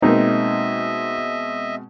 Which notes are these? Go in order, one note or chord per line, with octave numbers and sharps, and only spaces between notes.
B2 G#3 A#3 C4 D#4 D#5 E5